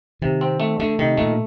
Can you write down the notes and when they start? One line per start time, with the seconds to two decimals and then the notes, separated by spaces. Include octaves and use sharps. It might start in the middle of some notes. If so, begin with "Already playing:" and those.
0.22 C3 D#3
0.41 C4
0.60 A3
0.79 D3 A3
0.99 C3 D#3
1.17 A#2 A3